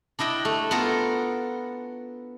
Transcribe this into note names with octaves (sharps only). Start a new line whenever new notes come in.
D4 E4 D#5 G5
A3
B3 F4 A4 A#4